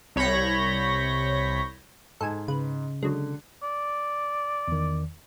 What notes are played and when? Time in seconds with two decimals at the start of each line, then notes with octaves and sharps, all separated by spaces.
0.16 C2 C#5 B5 G6 A#6
2.21 G#2 A4 G#5
2.48 C#3 B4
3.03 D3 F#3 G#3
3.63 D5
4.68 E2 D#3